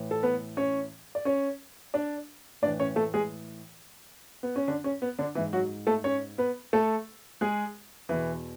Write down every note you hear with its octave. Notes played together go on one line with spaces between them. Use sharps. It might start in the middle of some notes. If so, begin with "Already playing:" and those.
Already playing: A2 E3
A4
B3 B4
C#4 C#5
D5
C#4 C#5
D4 D5
A2 E3 D4 D5
C#4 C#5
A3 A4
G#3 G#4
B3
C#4
D3 D4
C#4
B3
D3 D4
G#2 E3 E4
F#3 F#4
A3 A4
C#4 C#5
B3 B4
A3 A4
G#3 G#4
E2 B2 E3 E4